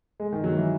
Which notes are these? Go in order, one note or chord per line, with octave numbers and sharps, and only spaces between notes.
G#3
D#3
F#3
E3